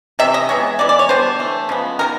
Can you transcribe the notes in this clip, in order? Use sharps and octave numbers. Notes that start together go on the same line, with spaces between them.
C3 E3 E5
D#5
E3 G#3 B3 C#5
E3 G#3 B3 D5
D5
C#5
D3 G3 B3 C5
E3 A3
C#3 F3 G#3 B3
D#3 G#3 B3 A#4